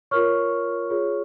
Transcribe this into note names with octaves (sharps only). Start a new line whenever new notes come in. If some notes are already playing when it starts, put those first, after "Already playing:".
F4 A#4 C#5 C#6 F6
F4 G#4 C#5